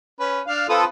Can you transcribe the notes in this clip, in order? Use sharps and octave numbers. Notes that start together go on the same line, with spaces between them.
C#4 B4
D4 F5 F6
C4 F4 A4 B4 D#6